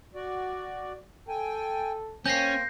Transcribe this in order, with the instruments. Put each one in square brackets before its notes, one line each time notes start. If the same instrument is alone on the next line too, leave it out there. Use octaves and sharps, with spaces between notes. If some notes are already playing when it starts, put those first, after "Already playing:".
[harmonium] F#4 D5
[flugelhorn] A4 [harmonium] G5 G#5
[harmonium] A#3 C5 G5 [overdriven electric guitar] C#4 [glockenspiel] G6 A#6 C7